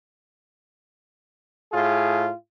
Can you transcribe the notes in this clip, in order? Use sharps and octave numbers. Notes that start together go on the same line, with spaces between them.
A2 F4 G#4